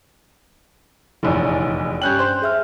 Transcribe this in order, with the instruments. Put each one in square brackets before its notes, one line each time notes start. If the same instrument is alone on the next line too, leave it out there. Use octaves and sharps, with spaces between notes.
[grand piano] F1 A#1 E2 [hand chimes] E4 C#5 D#5
[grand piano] G2 C#4 F#7 [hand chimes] G5 F#6 G6
[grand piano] C5
[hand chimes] G#4 E5 F6